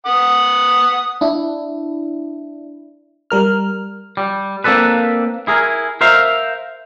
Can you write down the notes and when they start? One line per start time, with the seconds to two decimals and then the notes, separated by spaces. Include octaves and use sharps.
0.06 F#5 D#6
1.21 D4 E4
3.30 G3 A#4 F6
4.17 G3
4.64 A#3 C4 D4 A4 B4
5.47 E4 G#4 A#4
6.01 A#4 C5 E5 F5